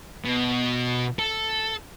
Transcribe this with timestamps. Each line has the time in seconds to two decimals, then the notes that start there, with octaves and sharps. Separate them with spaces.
0.24 B2
1.19 A4